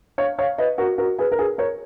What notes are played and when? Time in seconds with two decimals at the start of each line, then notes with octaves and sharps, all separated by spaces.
0.18 C#5 F5
0.38 C#5 F5
0.58 B4 D#5
0.78 F#4 A#4
0.98 F#4 A#4
1.18 G#4 B4
1.32 A#4
1.39 G#4 B4
1.58 A#4 C#5